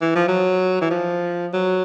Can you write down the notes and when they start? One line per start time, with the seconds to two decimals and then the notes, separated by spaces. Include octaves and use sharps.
0.02 E3
0.15 F3
0.28 F#3
0.81 E3
0.91 F3
1.54 F#3